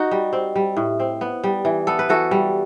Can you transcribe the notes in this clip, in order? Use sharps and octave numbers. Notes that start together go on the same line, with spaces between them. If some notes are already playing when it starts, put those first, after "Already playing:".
Already playing: D#4 F#4
G3
C4
G3
A2
C4
B3
G3
E3
B3 A4
B4
E3 F#4 A4
G3